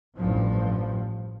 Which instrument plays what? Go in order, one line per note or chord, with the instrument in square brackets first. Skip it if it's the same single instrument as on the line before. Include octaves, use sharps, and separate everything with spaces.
[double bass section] A1 G2 F3